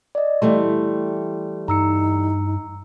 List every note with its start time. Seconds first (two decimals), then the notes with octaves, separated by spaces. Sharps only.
0.15 D5 D#5
0.42 E3 G3 A3 C6
1.68 G2 D#4 A#5 E6 C#7